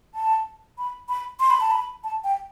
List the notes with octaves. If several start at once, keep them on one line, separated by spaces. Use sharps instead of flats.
A5
B5
B5
C6
B5
A5
B5
A5
G5